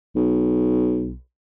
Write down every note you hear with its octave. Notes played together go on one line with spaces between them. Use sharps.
B1